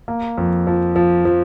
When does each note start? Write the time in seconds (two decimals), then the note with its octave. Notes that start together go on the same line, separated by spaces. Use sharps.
0.08 A#3
0.38 F2
0.67 F3
0.96 F3
1.25 F3